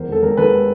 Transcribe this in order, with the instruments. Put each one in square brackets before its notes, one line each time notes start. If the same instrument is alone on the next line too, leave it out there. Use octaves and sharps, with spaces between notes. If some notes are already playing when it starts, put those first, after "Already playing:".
Already playing: [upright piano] E2 A#4 C5
E1 A4
E1 A#4
E1 A4 B4